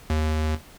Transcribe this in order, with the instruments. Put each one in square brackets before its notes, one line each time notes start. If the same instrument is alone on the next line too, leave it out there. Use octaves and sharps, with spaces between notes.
[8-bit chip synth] D#2